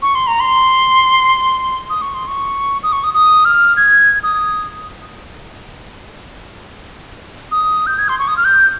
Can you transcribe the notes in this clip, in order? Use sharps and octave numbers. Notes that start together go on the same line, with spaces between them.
C#6
C6
A#5
C6
D#6
C#6
C6
C#6
D#6
C#6
D#6
D#6
F6
G#6
D#6
D#6
G6
G#6
C6
C#6
D#6
F6
G6